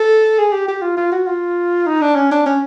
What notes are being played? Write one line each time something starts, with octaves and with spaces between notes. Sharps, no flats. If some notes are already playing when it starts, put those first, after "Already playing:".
Already playing: A4
G#4
G4
G4
F4
F4
F#4
F4
D#4
D4
C#4
D4
C#4